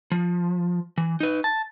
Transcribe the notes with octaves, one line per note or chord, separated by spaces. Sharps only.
F3
E3
D#4 B4
A5